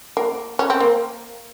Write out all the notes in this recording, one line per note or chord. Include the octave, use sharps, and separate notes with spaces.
A#3
C#4
C4
A#3